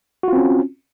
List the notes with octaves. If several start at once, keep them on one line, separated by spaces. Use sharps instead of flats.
C4 C#4 F4 F#4